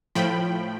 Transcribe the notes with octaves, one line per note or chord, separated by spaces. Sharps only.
A2 F3 G5 B5